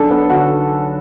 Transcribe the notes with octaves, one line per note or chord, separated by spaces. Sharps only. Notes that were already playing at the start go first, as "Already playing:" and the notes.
Already playing: B1 D4 A4
B3
D3 F#4